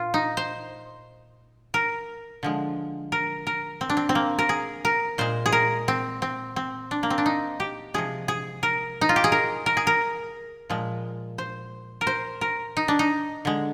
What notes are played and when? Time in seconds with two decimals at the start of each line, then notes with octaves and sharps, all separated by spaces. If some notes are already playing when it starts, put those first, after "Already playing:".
Already playing: A#2 F4
0.14 D#4
0.37 C5
1.74 A#4
2.43 D3 F3 G#3
3.12 A#4
3.47 A#4
3.81 C4
3.90 D4
3.97 C4
4.09 C4
4.15 A#3
4.39 A#4
4.49 G#4
4.85 A#4
5.18 A#2 G#3 C5
5.46 G#4
5.52 A#4
5.88 C4
6.22 C4
6.56 C4
6.91 D4
7.03 A#3
7.10 C4
7.18 D4
7.26 D#4
7.60 G4
7.94 C3 F3 G#3 G#4
8.28 G#4
8.63 A#4
9.01 D#4
9.09 F4
9.16 G4
9.24 G#4
9.32 A#4
9.66 A#4
9.77 G#4
9.87 A#4
10.70 A#2 F3 G#3
11.38 C5
12.01 A#4
12.07 C5
12.41 A#4
12.77 D#4
12.88 D4
12.99 D#4
13.45 D3 G#3